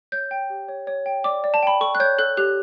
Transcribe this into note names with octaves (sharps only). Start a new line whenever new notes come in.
C#5 G6
G5
G4
C#5
C#5
G5
D5 D6
D5
A5
G5 B5
A4 C#6
F#6
C#5 G6
A4 F#6
G4 F#6